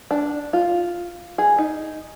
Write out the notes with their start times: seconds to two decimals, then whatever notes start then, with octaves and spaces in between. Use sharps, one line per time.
0.11 D4
0.53 F4
1.38 G#4
1.58 D#4